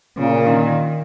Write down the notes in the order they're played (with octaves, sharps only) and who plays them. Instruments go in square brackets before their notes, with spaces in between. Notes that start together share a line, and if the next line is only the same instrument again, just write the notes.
[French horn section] A#2 [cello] C#3
[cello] D#3